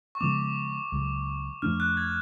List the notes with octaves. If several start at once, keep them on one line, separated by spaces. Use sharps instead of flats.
C#6
C#3 F3 G#3 B3 D6
C#2 C#3 F#3
F2 F3 A3 D4 F6
F#6
G#6